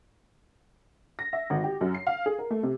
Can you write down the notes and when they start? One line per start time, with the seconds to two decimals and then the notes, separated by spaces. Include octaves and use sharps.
1.19 A#6
1.33 E5
1.50 G#1
1.64 G4
1.81 F#2
1.95 C7
2.07 F5
2.26 G#4
2.39 A#4
2.51 A3
2.63 C3